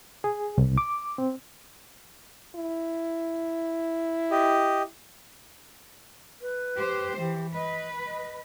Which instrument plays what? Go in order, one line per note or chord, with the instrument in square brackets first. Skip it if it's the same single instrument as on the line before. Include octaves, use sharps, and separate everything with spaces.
[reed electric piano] G#4
C2
D6
C4
[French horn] E4
[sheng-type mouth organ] G4 D#5
[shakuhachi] B4
[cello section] G4 C5
[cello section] E3 [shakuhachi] G4
[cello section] B4 [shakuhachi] D#5
[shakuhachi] D#5